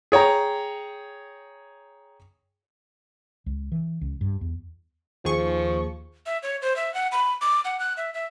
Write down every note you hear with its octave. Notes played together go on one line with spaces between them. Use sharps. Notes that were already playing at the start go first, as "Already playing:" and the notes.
G#4 C#5 G5 A#5
C#2
E3
C#2
G2
E2
D#2 F3 G#4 C#6
E5
C#5
C5
E5
F#5
B5
D6
F#5
F#6
E5
E5